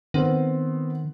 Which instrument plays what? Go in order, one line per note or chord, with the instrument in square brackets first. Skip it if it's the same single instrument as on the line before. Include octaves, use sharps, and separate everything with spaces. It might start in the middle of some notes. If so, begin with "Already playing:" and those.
[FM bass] D#3 [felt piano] B3 C4